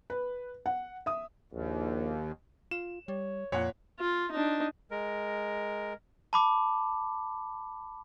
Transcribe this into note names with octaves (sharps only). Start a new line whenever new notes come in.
B4
F#5
E5 D#6
A#1 D#2
F4 E7
G3 C#5
F2 A#2 C#5 F#5
F4
D4 D#4
G#3 A#4
A5 B5 D6